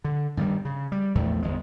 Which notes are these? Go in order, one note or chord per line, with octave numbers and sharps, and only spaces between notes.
D3
G2 D#3 F#3 G3
C#3
G3
A#1 E2 A2 A3
G1 E2 G#3